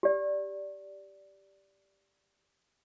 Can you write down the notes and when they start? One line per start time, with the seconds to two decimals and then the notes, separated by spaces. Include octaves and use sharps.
0.03 G4 D5